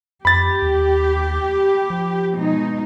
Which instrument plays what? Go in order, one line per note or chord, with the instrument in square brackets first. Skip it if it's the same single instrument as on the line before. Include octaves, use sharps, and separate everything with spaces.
[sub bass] F2 [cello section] G4 [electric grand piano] B5 A6
[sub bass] D#2
F3
[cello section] B2 G#3 D#4